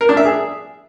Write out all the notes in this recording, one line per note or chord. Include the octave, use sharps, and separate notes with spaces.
A#4
D4
E5
G#4